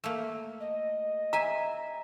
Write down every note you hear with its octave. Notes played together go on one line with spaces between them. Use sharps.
A3 A#3
D#5
E5 G#5 A#5